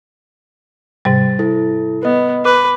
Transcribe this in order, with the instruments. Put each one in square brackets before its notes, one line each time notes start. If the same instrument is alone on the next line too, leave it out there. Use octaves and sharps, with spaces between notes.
[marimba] G#2 C3 G3 [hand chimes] A6
[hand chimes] E4 A4
[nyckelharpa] B3 [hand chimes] B4 D#5
[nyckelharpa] B4 [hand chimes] D6